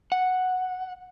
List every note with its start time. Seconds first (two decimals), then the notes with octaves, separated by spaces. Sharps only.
0.12 F#5